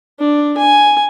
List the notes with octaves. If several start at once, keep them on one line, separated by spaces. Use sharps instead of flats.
D4
G#5